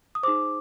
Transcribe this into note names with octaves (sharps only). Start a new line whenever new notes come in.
D#6
D#4 G#4 C5 D6